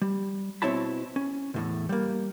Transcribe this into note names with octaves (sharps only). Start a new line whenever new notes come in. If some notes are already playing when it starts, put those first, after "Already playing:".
G3
B2 C4 E4 C#5 A5 B5
C#4
E2 A2 C3
G3 A#3